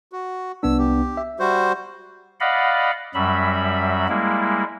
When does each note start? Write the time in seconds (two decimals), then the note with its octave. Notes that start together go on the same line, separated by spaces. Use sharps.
0.12 F#4
0.63 C2 B3 D4 E6
0.78 G4
1.17 E5
1.39 G3 F#4 C5
2.40 D5 D#5 F5 F#5 B5
3.14 F#2 F#3 G3 E5 B5
4.09 G3 G#3 A#3 E4